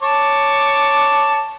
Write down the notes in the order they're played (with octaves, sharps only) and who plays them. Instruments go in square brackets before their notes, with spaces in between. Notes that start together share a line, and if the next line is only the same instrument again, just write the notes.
[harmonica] C#5 A5 D6